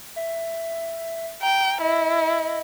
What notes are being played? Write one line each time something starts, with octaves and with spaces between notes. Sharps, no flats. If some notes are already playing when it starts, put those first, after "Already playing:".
E5
G5 A#5
E4 D#5